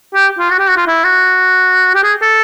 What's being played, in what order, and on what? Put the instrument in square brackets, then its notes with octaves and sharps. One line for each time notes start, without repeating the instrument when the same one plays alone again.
[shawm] G4
F4
F#4
G4
F#4
F4
E4
F#4
G4
G#4
A4